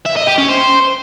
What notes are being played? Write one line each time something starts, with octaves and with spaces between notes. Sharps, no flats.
E5
D#5
G4
C#4
C5